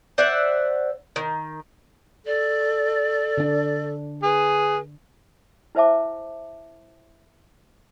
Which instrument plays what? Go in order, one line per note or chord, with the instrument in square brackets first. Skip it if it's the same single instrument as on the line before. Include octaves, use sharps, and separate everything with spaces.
[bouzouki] C5 D5 E5 F#5
D#3
[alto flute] A4 [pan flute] D5
[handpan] D3 D4
[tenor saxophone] G#4 [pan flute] B4
[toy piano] E4 B4 C5 E5 A5 D6